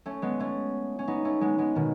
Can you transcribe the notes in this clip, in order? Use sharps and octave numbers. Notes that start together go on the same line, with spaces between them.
A3 C#4
G#3 B3
A3 C#4
C#4
B3 D#4
A3 C#4
G#3 B3
G#3 B3
B2 D#3